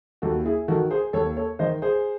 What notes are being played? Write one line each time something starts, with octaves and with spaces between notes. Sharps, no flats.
D#2 F#4 A4
E4 G#4
D#3 F#4 A4
G#4 C5
D#2 A4 C#5
A4 C#5
D#3 C5 D#5
G#4 C5